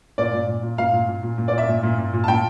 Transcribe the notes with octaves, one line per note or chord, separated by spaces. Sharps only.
A#2 D5
A#2
A#2
A#2
A#2 F5
A#2
A#2
A#2
A#2
D5
A#2
E5
A#2
A#2
A#2
A#2
A5
A#2 G5